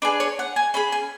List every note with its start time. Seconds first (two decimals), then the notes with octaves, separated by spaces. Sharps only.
0.02 D4 G#4 B4
0.20 C#5
0.39 F#5
0.56 G#5
0.74 C#4 G#4 B5
0.92 G#5